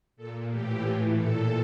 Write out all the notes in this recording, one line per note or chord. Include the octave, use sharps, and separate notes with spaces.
A#2 A4
A2 E3 G4
A2 E3 F4
A#2 A4